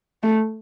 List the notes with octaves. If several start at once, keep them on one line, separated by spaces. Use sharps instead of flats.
A3